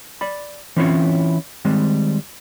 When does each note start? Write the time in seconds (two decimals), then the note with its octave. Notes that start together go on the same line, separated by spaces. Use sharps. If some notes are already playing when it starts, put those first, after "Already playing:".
0.21 D5 B5
0.76 E3 C4 C#4 E4 F4 C#5
1.65 D#3 G3 G#3 C4